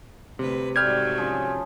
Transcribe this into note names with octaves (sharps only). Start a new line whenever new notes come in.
D2 C3 G3 B4
G#2 F#3 G3 A3 F6 G6 G#6
C#3 F3